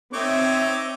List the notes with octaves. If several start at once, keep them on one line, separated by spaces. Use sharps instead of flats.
C4 D#4 C#5 E5 D6